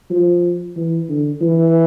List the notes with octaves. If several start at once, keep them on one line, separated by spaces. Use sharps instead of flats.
F3
E3
D3
E3